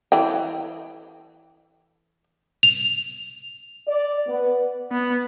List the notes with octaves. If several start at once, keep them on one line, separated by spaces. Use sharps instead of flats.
E3 A4 G5
F7
D5
B3
B3